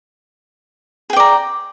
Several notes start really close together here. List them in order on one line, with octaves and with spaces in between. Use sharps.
G#4 G5 D5 A#5